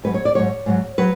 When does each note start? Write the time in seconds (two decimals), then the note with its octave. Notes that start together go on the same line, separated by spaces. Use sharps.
0.04 G#2 F#3 B4
0.14 C#5
0.25 D5
0.35 G#2 F#3 C#5
0.66 G#2 F#3
0.98 F#3 B4